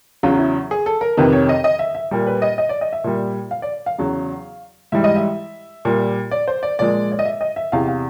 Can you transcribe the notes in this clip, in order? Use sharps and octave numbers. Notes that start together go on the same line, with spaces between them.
E2 C#3 F#3 F4
E4
G#4
A4
A#4
F2 C3 D#3 B4
C#5
D#5
D#5
E5
E5
A#2 G3
B4
D#5
D#5
D5
D#5
E5
A#2 G3
F5
D5
F5
E2 C#3 F#3
G#2 E3 G3 E5
D#5
E5
A#2 G3
D5
C5
D5
A#2 F3 G#3 D5
D5
D#5
E5
D#5
E5
E2 C3 E3 F5
F5